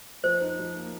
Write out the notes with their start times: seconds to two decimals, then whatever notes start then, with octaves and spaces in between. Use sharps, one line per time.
0.23 F3 C5
0.41 D#4
0.59 F3
0.76 A#3